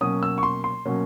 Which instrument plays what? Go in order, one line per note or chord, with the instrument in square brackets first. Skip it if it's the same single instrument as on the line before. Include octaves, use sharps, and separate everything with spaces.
[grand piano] B2 F#3 A#3 C#4 D#6
E6
C#6
C6
C6
B2 F#3 A#3 C#4